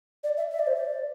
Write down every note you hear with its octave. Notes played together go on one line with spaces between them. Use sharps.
D5
E5
E5
D5
C5
D5